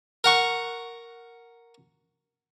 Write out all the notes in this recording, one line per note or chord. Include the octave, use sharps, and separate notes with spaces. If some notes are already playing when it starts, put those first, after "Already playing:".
A#4 F#5 C#6